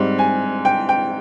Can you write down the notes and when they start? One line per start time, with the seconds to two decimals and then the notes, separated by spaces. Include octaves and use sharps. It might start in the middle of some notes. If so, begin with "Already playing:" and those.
Already playing: G#2 G3 C4
0.19 G#5
0.65 G5
0.89 G5